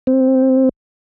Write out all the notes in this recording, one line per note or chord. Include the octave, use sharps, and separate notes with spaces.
C4